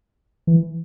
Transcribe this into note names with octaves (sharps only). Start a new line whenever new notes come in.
E3